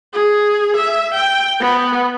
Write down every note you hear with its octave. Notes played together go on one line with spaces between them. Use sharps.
G#4
E5
G5
B3